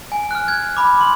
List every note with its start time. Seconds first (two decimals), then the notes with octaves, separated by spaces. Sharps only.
0.12 G#5
0.31 F6 F#6
0.48 G#6
0.77 B5 D6
1.01 C6